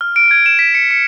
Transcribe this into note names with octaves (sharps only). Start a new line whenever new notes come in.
F6
D7
G#6
E7
B6
C#7
C#7